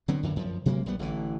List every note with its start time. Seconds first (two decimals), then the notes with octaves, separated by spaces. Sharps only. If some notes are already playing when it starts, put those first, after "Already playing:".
0.08 D3 F#3 B3 C4
0.23 F#2 D3 E3
0.36 F#2 F3
0.66 C3 F#3 G#3 A#3
0.86 A#1 G3 B3
0.99 A1 D3 E3